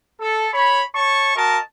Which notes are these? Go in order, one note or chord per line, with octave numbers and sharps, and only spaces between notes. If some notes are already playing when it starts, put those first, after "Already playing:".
A4
C#5 B5
C#5 A5 C#6
F#4 A#4 D#5 A5